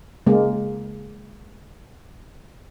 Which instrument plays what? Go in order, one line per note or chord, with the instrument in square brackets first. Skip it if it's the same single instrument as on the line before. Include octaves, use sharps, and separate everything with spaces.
[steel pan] C#3 G#3 A#3